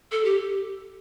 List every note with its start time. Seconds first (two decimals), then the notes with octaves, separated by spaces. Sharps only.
0.11 A4
0.24 G4